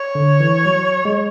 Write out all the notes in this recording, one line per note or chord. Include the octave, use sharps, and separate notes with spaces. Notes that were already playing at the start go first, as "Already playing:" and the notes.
Already playing: C#5
D3
E3
F#3
G#3